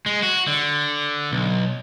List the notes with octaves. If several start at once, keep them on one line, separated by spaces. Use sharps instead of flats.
G#3
F#4
D3
B1